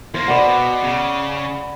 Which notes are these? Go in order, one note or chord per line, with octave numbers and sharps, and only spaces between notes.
E2 A#3 C5
B2 B4 D5 F#5
C#3